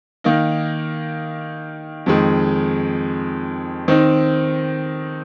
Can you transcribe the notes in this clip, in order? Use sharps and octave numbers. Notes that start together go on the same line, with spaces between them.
D#3 A#3 D#4
F2 D#3 G#3
D#3 C4 D#4